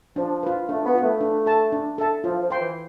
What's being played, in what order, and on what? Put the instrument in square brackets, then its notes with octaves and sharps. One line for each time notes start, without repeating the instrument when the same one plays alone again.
[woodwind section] F3 [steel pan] D4
[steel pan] F4 B4
[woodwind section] A3 [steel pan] D4
[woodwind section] B3
[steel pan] F4 B4
[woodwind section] A3
[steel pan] D4
A4 E5 A5
D4
A4 E5 A5
[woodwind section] F3 [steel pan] F4
[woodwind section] F3
[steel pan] C5 G5 C6
[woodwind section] E3